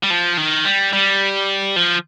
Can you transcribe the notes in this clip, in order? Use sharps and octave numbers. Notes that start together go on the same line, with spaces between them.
G3
F3
D#3
G3
G3
F3